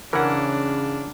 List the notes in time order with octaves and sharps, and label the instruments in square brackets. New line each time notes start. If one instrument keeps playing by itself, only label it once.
[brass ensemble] C#3 [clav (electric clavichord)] E3 C#4 [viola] D4 [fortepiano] A#4 F#5